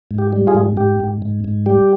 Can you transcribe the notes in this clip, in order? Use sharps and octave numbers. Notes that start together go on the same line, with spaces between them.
G#2
G4
G3
F4 G#4
G#2
G#2 G4
G#2
G#2
G#2
G3 G4